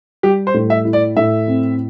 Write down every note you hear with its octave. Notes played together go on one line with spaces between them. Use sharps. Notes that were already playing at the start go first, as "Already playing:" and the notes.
G3 G4
C5
A2
E5
E4
D5
A2 E5
C4